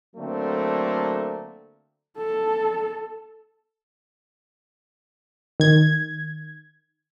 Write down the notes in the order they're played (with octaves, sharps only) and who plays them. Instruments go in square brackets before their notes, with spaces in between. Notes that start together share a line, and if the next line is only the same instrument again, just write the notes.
[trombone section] D3 F#3 A3 A#3 C4
[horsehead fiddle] A4
[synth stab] D#3 G#6